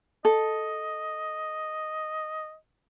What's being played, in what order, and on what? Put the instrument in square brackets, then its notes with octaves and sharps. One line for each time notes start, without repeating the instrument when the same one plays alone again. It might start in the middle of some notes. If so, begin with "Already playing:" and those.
[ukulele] A4 [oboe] D#5